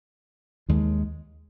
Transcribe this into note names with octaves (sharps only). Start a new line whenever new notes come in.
D#2 D#3 G#3